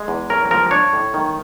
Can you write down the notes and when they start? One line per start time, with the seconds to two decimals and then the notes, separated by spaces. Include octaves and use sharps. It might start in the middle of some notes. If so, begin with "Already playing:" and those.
Already playing: G#3
0.08 E2
0.30 C#4 A#4
0.51 F3 A#4
0.71 D4 C#5
0.93 A2
1.14 D#3